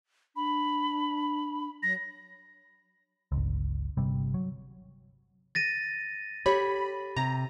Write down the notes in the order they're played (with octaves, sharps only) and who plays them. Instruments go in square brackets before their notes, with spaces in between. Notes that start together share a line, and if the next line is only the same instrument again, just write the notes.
[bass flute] D4 [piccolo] B5
[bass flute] F#3 [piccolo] A#6
[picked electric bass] G1 C#2
G1 C3 G3
F#3
[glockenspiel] A6 A#6 D#7
[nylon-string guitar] G4 A4 C#5 [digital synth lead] B5
[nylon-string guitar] C3 [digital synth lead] A#5